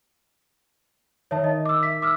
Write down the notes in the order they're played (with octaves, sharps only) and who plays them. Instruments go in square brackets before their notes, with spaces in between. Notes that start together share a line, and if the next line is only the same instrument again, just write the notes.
[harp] D#3 D#4 [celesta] C#5 E5 A5
[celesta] D#5
D6 E6
[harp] E5 [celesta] B6
[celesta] D6 E6 F6